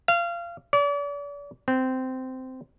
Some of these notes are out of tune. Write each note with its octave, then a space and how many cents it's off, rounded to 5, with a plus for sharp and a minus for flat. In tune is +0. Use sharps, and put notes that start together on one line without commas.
F5 -25
D5 -40
C4 -15